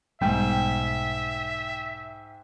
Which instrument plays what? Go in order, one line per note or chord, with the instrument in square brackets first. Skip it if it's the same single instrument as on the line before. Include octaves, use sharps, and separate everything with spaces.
[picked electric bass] B1 G3 B3 [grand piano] G#2 [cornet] E5 [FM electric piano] G5